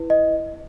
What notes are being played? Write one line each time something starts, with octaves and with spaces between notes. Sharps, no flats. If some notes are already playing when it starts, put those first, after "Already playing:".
Already playing: E4 B4
D#5